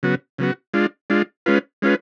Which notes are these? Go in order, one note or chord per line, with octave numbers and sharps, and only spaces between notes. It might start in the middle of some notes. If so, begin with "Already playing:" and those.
C#3 F#3 B3 F#4
C#3 F#3 B3 F#4
G#3 D4 F4
G#3 D4 F4
G#3 C#4 F4 B4
G#3 C#4 F4 B4